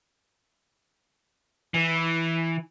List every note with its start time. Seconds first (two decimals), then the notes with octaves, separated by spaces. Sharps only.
1.74 E3